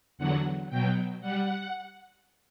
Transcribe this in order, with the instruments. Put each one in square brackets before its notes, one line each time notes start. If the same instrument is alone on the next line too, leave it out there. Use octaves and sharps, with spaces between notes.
[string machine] E2 D3 F#3 F#5
B2 F#3 G5
G3 F#5